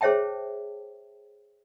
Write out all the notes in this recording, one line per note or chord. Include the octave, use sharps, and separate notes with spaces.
G#4 C5 C#5 E5 G5 A5